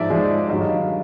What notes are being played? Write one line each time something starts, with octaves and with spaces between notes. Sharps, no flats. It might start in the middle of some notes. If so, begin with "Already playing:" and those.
Already playing: G#2 F3 G#3 D5 E5
G#2 F3 G#3
G2 D#3 F#3 D#5 F5